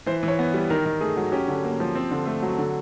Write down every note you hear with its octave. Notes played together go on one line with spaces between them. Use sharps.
E3 C5
E3
C#5
B3
G3
D#3 A#4
D#3
A3 G#4
F#3
C#4 G4
D3
A#3
F3
C4
D3
A3
F#3
D3